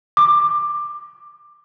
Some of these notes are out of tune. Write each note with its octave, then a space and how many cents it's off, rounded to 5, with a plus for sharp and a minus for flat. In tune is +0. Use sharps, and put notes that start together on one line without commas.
D6 +15